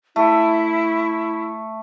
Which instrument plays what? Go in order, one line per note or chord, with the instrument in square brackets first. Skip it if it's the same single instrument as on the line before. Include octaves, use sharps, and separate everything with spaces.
[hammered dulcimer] A3 [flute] E4